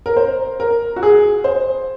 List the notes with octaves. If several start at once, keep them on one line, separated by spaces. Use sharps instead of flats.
A#4
C5
A#4
F#4
G#4
C5